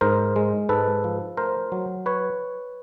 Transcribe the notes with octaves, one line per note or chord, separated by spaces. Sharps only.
G#2 A#4 C5
G#3
G#2 A4 B4
F3
A3 A#4 C5
F#3
B4 C#5